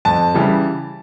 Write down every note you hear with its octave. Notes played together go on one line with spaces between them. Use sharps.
F2 A5
C#3 E3 G3